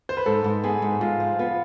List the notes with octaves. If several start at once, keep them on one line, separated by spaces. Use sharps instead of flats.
C5
B4
G#2 A4
G#2
B3 G#4
G#2
G#2 F4
F3
B3 F4